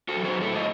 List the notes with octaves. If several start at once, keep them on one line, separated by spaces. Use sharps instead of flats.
F#4 A4
F#3
G#4 C5
A2 A4 C#5
D#5